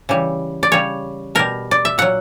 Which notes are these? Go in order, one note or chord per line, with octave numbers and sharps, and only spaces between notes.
C#3 E3 G3
D5
C#3 G3 C#5
B2 G3 A#4
D5
E5
A#2 F#3 F#5